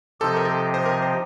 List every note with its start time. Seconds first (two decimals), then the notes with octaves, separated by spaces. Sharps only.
0.20 C3 F3 C4 D#4 G4 A4
0.37 A#4
0.45 A4
0.74 C5
0.86 A#4
1.02 C5